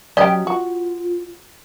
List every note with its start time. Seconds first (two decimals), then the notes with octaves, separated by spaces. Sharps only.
0.17 F#3 C#4 G4 D5 D#5 G5
0.47 F4 F#4